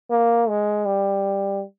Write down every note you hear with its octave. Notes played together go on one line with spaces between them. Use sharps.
A#3
G#3
G3